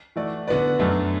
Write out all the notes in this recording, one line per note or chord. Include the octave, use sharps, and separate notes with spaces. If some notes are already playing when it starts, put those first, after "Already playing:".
E3 A3 F#4 D5
D3 B3 F#4 B4 D5
F#2 F#3 A3 D4